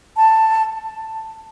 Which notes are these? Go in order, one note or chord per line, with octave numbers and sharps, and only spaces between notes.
A5